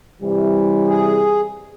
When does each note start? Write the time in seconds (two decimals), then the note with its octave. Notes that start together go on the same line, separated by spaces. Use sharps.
0.22 C3 E3 G3
0.87 G#4